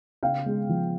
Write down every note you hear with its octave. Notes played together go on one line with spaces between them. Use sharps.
C#3 F5 G5
G#3
F3